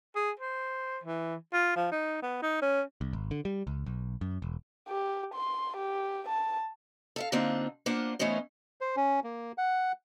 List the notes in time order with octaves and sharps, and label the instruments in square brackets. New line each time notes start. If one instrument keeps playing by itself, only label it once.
[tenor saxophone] G#4
C5
E3
F4
F3
D#4
B3
D#4
C#4
[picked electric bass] C2
G#1
D3
G3
C#2
B1
F#2
E1
[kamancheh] G4
C6
G4
A5
[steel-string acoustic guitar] A4 E5 F5
D3 A#3 C4 D4 D#4 F4
A#3 D4 F4 C5 F#5
E3 A3 B3 C#4 D#4 C5
[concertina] C5
C#4
A#3
F#5